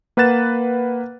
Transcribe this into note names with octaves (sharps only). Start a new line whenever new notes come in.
A#3 B4 F#5 F#6 A6 E7